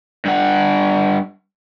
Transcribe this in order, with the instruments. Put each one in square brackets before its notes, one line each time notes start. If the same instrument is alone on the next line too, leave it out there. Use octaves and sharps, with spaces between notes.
[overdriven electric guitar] G2 F#5